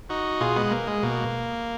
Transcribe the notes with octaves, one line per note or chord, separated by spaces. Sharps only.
D#4 F#4
B2 F4 G#4
G#3 B3
A#3
G#3
B2 A#3